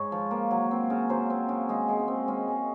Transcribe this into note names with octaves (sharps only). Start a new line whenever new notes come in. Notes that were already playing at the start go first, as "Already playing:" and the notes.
Already playing: G#2 C#5
F3
A#3
F#3
C4
C#3
F#3 C5
C4
C#3
G#3 G#4
G#3
C#4
C4
G#3 C#4
G#3